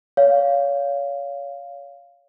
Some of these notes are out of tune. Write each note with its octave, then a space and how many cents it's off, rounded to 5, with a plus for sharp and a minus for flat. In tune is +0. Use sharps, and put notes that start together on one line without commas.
C#5 +30 F5 +0